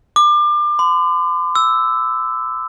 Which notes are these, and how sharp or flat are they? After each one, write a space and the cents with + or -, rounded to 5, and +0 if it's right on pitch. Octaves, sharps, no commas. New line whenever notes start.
D6 +30
C6 -45
E6 +0